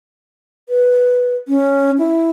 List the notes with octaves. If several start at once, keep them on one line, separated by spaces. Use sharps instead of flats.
B4
C#4
E4